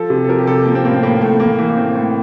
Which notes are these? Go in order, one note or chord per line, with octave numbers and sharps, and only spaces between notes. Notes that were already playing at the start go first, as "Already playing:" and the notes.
Already playing: F3 A4
C3
A4
F3 A#4
G4
C3 A4
F3 A#3
C4
A2 A#3
C4
A2 A#3
A2 A3
E3 A#3
E3 A#3
A#3
A2 C4
A2